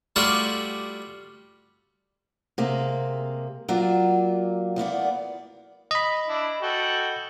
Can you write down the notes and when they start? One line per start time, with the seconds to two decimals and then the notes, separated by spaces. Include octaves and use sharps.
0.16 G3 A3 F4 F#4 D5
2.58 C3 G#3 A#3
3.69 F#3 A#3 F4 D5
4.76 E2 A#3 B3 D5
5.91 D#5 B5
6.28 D4 E4 D5
6.62 F#4 A4 G5